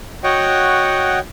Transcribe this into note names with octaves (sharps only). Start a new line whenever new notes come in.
F#4 C#5 D#5 F#5 G5